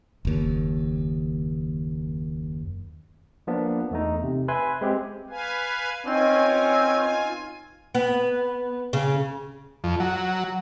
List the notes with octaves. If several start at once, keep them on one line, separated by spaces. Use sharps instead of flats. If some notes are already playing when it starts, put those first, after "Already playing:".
F#1 D#2
F3 A#3 B3 D4
E2 A3 D#4
C3
B4 E5 G#5 C6
G#3 C4 G4
B4 F5 G#5
C4 C#4 D#4 F4 B4 D#5 G#5
B3
C#3
F2
F#3